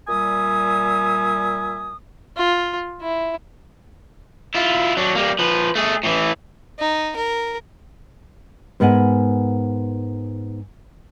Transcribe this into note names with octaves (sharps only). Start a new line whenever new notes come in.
A#2 G3 E5 G#5 D#6
F4
E4
E4 F4
F#3 D4
G3 A#3
F3 B4
A3 G#4
A2 E3
D#4
A#4
G#2 B3 A#4 F#5 G#5